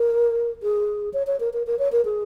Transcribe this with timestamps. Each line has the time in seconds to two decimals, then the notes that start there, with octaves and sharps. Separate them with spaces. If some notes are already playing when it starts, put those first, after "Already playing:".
Already playing: A#4
0.63 G#4
1.14 C#5
1.27 C#5
1.40 A#4
1.53 A#4
1.67 A#4
1.79 C#5
1.92 A#4
2.05 G#4